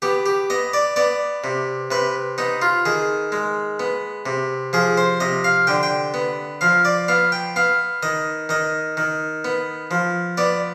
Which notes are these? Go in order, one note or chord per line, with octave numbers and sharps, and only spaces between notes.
B3 G4
G4
B3 D#5
D5
B3 D5
C3
C3 B4
B3 D#4
F4
D#3 G#4
G#3
B3
C3
F3 G#4
C5
C3 D#5
F5
D3 G5
G5
B3
F3 F5
D5
B3 F5
G5
B3 F5
D#3 D#5
D#3 D#5
D#3
B3
F3
B3 D5